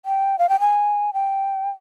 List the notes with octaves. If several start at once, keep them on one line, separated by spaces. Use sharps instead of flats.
G5
F5
G5
G#5
G5